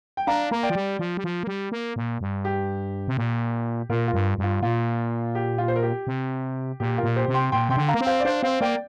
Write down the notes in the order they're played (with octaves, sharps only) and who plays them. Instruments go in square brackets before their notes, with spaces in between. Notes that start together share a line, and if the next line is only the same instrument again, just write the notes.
[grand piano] G5
[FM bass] D4 [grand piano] F5 A#5
[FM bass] A#3 [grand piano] A#5
[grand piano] D5 G5
[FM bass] F3
G3
F3
G3
F3
A#3
G3
A#3
A#2
G2
[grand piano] G4
[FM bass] C3
A#2
[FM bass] A#2 [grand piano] F4 A#4
[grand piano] F4 A#4
[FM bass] G2
G2
[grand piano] F4
[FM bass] A#2 [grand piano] F4
[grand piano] G4
F4
C5
A#4
G4
[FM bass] C3
[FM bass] A#2 [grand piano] G4
[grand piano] F4 A#4
[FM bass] A#2
[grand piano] G4 C5
[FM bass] C3
[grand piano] G5 C6
[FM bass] A#2 [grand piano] G5 C6
[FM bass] C3 [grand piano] G5 C6
[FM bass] D3
[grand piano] F5 A#5
[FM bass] A#3
C4
[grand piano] C5 F5
D5
[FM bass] D4 [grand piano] C5 F5
[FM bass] C4 [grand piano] C5 F5
[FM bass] A#3 [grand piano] D5 G5